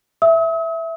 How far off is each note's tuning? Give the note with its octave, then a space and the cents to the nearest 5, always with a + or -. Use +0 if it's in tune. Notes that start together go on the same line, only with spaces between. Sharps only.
E5 +0 D#6 +45